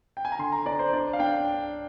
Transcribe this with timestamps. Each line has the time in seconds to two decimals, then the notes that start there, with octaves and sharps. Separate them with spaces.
0.17 G5
0.25 G#5
0.32 A#5
0.39 D3 C6
0.52 A#5
0.66 D4 D5
0.79 C5
0.93 D4 D5
1.13 F5
1.20 D4 G5